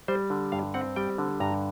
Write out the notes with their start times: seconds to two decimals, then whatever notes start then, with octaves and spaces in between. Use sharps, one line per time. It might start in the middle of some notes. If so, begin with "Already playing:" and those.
0.08 G3 C5
0.30 D3
0.52 G2 F5
0.74 C4 F#5
0.96 G3 G5
1.18 D3
1.40 G2 A#5